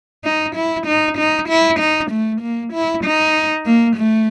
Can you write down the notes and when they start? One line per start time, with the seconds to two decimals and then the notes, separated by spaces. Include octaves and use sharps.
0.25 D#4
0.56 E4
0.87 D#4
1.18 D#4
1.49 E4
1.79 D#4
2.11 A3
2.41 A#3
2.73 E4
3.04 D#4
3.65 A#3
3.96 A3